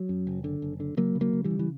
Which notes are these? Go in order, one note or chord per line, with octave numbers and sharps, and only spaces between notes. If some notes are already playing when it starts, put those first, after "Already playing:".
Already playing: F#3
F#2
F#1
D3
F#1
D3
C#3 F#3 A#3
C#3
F#3 A#3
C#3
E3 G3
C#3
E3